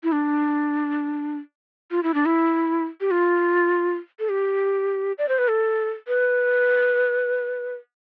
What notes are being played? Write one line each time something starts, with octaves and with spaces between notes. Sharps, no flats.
E4
D4
F4
E4
D4
E4
G4
F4
A4
G4
D5
C5
B4
A4
B4